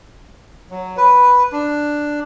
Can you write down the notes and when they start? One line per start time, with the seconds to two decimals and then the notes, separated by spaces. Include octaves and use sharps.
0.71 F#3
0.97 B4
1.52 D4